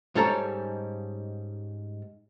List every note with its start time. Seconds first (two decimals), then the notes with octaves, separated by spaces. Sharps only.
0.15 G#2 G3 C#4 A4 C#5 A#5